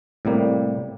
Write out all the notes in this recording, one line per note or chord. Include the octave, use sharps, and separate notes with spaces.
A2 C3 G3 A#3